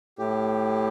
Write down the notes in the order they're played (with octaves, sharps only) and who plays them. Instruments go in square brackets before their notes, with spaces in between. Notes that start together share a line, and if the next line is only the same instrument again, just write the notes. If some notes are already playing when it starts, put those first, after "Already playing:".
[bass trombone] A2 [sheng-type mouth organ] G4